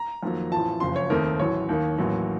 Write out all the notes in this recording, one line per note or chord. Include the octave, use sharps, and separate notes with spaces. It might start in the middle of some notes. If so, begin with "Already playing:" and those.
Already playing: A#5
F2 D#3 F#3 A#3
A1 A2 F3 A5
F#1 F2 C#3 C6
C#5
D#2 D#3 A3 C4 A#4
A1 A2 F#3 C#5
D#2 D#3 A#3
A1 A2 F#3 A#3